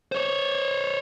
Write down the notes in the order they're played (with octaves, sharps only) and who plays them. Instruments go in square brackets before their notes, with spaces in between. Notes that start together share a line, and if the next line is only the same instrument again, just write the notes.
[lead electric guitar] C5 C#5